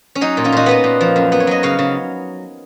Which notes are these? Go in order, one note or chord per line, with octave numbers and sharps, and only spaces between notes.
C#4
F#3 D#4
A#2
C#4 F4
A#2 D#4 F#4
B3 B4 D#5
A#2
F3
F#2
B3
C#5
F#3 D#5
C#3 C#5 F5
C#3